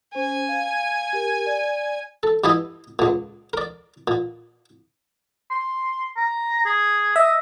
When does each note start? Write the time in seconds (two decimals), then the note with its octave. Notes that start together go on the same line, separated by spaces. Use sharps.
0.15 C#4 C5 G#5
0.49 F5
1.13 G4 A#4
1.46 D5
2.23 A4
2.44 G2 E3 E4 G4 D#5
2.99 C#2 A#2
3.53 A#4 D5
4.08 A#2
5.50 C6
6.17 A#5
6.65 G#4
7.16 D#5 E5